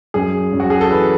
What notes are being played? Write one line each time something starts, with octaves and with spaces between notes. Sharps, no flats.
F#2 G#4
F#2
F#4
G#4
A4
E3 B4